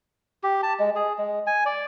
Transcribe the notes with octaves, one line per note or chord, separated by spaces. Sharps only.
G4
A5
G#3
G#4
G#3
G#5
D5